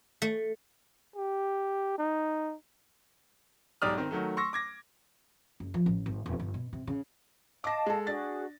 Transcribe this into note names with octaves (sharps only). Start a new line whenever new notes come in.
A3
G4
D#4
B1 G#2 G4 D5 D#6 F6
D#3 C4
D#3 F#3 A3
C6 C#6 E6 A#6
D6 G#6 A#6
F#1
F3
A1
G#1
E1
G1
B2
C3
C#3
D#5 F5 A5 D6 A#6
G#3 A4
D4 F#4 G#4 A6